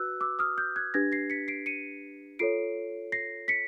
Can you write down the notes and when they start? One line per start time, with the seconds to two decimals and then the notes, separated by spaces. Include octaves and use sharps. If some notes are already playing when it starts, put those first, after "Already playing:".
Already playing: F#4 B4 E6 F#6
0.21 D6 E6
0.39 D#6 F6
0.58 F6 G6
0.76 F#6 G#6
0.94 D4 G4 B4 G#6 A#6
1.12 A#6 C7
1.30 B6 C#7
1.48 C7 D7
1.66 C#7 D#7
2.39 F4 A4 C#5 C7 D7
3.12 A#6 C7
3.48 B6 C#7